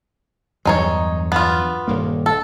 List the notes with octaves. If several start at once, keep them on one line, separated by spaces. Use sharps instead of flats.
E2 G2 F#3 G#3 D#4 C#5
B3 F4
D#1 G2 A#3
A4